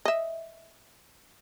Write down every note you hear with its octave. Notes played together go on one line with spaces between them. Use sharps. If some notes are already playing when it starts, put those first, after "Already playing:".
D#5 E5